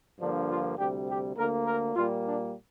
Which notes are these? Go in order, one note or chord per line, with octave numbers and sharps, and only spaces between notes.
G2 D3 F3 A#3 D4
F4
D2 C3 G3 G4
G4
D2 D3 A#3 A#4
A#4
A#2 G3 A#3 F4
D4